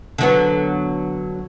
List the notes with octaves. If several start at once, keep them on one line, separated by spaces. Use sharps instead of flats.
D3 F#3 B3